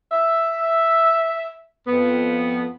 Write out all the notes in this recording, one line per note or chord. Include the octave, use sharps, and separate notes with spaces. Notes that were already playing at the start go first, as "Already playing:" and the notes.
E5
F2 B3